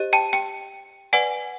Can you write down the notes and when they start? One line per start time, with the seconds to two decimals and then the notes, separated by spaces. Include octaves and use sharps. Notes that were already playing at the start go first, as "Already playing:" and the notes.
Already playing: G4 C5 D#5
0.13 G5 A5
0.33 G5
1.13 B4 D5 F#5 G#5